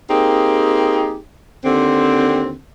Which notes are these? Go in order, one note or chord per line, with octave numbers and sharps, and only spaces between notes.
A#3 C4 D#4 G4 G#4
D#2 D3 C4